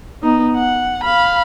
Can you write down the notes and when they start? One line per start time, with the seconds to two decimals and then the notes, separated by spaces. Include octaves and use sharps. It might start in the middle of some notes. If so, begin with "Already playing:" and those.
0.23 B3 D#4
0.56 F#5
1.04 F5 B5